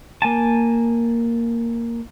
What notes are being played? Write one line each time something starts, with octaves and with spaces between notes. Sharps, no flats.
A#3 G#5 A5